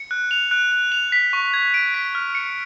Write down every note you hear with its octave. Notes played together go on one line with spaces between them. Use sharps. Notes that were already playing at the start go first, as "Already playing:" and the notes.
Already playing: C#7
F#6
F7
F#6
F#6
F7
B6
C#6
G#6
D7
B6
F6
C#7